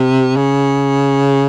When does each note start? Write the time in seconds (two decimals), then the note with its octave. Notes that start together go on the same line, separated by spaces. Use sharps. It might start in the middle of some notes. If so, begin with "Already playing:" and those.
Already playing: C3
0.36 C#3